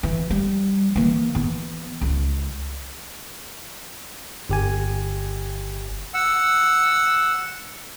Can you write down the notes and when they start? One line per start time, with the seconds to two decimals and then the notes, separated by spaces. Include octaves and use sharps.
0.03 E3
0.30 G3
0.96 E3 A#3
1.35 E3 B3
2.01 C#2
4.49 G1 G4 G#5
6.14 F#5 E6